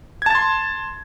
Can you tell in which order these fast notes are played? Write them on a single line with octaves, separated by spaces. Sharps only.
G#6 A5 A6 C6